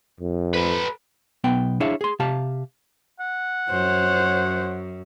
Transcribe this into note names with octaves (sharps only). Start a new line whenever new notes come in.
F2
A4 B4
B1 B3 G5
D4 E4 G#4 C#5 E5 F5
G#4 C6
C3 G4 F5 A5
F#5
F#2 C5 C#5